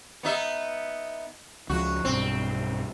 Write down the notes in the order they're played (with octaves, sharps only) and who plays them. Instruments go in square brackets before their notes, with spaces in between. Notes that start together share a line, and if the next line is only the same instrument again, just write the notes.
[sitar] B3 D#4 E5
[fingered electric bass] C#2 F3 [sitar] F#4
[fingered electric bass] B1 G2 [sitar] C4